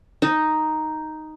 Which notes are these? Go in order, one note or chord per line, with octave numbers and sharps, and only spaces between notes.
D#4